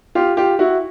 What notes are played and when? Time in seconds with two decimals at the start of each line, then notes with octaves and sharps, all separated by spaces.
0.15 F4 G4
0.37 F4 G4
0.59 E4 F#4